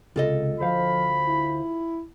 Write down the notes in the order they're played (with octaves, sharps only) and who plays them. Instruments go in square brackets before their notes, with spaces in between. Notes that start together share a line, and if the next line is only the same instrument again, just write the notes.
[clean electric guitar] C#2 C3 [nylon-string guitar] F4 A4 D#5
[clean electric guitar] D2 C5 F5 [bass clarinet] F3 [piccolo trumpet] B5
[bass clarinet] E4